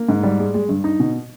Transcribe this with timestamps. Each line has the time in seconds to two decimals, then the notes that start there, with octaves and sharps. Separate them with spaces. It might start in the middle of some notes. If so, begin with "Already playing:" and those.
Already playing: A#3
0.09 G#2
0.23 G3
0.39 G#3
0.54 G#3
0.69 G2
0.84 D#4
1.00 B2